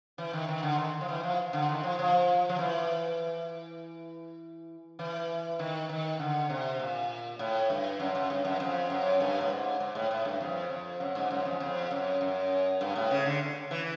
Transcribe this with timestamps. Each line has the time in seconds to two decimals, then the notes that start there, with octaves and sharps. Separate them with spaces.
0.18 E3
0.33 D#3
0.48 D#3
0.63 D3
0.78 D#3
1.01 F3
1.09 E3
1.23 F3
1.53 D3
1.69 D#3
1.83 F3
1.99 F3
2.49 F3
2.59 E3
4.99 E3
5.59 D#3
5.89 D#3
6.19 D3
6.50 C3
6.79 A#2
7.39 A2
7.70 G2
8.00 F#2
8.15 F#2
8.30 G2
8.45 F#2
8.60 F2
8.90 F#2
9.20 G2
9.41 A2
9.50 G#2
9.80 G#2
9.95 A2
10.11 A2
10.25 G2
10.41 F2
10.70 F2
11.00 F#2
11.15 G#2
11.31 F#2
11.45 F2
11.60 F2
11.91 F#2
12.21 F#2
12.81 G2
12.96 A2
13.11 C#3
13.26 D3
13.71 E3